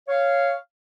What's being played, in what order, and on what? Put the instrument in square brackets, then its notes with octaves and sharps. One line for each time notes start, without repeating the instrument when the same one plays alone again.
[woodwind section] C#5 F5